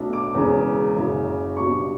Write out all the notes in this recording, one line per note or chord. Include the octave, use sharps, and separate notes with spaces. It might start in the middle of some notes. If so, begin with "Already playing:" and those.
Already playing: B1 B2 A3 D4
D6
E1 E2 C#3
F#1 F#2 C#3
B1 B2 G3 D4 C#6